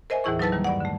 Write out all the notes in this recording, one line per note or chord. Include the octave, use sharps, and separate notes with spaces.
A#4 C5 D#5 E5 G#5
D#2 A2 E3 E4 G#4 C#6
F#3 D#4 E4 B4 A5 A6
D#3 G3 A#3
G2 D5 F#5
D3 A3